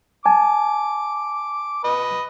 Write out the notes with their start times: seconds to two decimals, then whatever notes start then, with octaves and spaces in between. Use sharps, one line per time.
0.26 G#5 A5 D6
1.84 B4 D#5